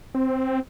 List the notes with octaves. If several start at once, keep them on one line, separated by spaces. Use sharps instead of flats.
C4